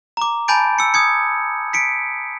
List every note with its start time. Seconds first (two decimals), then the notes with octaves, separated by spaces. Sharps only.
0.17 A#5 D6
0.48 G#5 A5 B5 G6 A6 D7
0.79 E6 C#7
0.94 D#6 G#6 C#7
1.73 B6 C#7 D7